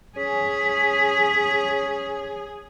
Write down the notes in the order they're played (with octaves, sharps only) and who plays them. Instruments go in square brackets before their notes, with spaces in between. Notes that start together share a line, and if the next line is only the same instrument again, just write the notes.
[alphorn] C#4 [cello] G#4 [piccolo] B6